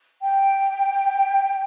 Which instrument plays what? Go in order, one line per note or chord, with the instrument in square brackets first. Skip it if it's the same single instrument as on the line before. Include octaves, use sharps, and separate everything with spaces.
[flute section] G5